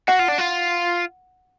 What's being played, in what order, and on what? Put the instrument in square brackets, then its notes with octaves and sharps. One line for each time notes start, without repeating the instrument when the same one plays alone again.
[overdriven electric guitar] F#4 [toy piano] F#5
[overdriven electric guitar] F4
D4
F4